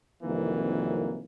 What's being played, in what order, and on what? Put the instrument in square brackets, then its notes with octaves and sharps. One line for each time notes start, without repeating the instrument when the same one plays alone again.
[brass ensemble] C2 F2 D#3 E3 F#3 A#3